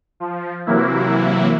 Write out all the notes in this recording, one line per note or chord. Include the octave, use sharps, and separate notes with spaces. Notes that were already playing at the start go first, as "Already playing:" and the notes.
F3
C3 E3 F#3 A#3 E4